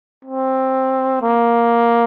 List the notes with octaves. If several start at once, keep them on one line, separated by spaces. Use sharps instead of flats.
C4
A#3